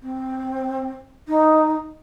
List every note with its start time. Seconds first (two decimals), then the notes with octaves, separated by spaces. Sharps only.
0.02 C4
1.28 D#4